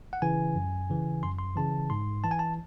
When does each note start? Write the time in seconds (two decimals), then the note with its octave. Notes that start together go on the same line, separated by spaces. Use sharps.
0.13 F#5
0.22 C#3 E3 G#5
0.55 F#2
0.90 C#3 E3
1.23 F#2 C6
1.38 C6
1.56 C#3 E3 A5
1.90 G#2 C6
2.24 E3 A5
2.31 G#5
2.39 A5